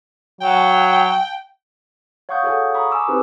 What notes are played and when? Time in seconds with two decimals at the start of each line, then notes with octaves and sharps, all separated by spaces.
0.41 F#3 G5
2.29 C#5 F5 F#5 C#6 D#6 G6
2.43 F#4 G#4 A4 C#5 F5 F#5
2.74 A#5 B5 C#6 D#6
2.91 G#5 D6 E6
3.08 C4 D#4 G4 G#4 B4 C5